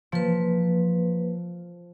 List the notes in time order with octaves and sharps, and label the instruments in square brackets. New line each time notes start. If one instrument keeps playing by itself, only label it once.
[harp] F3 [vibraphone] A#3 B4